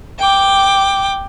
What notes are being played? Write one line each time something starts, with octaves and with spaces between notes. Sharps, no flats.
G5 D6